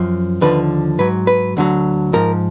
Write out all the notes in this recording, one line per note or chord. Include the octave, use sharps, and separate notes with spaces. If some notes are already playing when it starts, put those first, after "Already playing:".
Already playing: F#2 F3
D#2 D3 F3 B4
G#2 F#3 B4
B4
D2 D3 F#3
G#2 F3 A#4